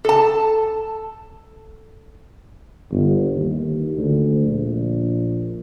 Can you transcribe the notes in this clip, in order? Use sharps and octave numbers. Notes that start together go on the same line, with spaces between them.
A4 A5
G1
D#2
D2
A#1